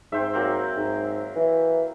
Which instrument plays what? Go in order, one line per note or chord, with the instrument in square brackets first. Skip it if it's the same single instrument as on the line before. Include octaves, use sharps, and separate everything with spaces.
[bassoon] G#2 [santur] C4 C5 E5
[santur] F#3 A#3 C4
[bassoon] G#2
E3